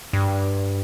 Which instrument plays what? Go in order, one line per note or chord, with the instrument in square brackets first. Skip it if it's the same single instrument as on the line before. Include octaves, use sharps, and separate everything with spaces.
[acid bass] G2